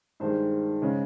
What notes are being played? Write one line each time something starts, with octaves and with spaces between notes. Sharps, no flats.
G2 D#3 G#3 C5
C#3 G#3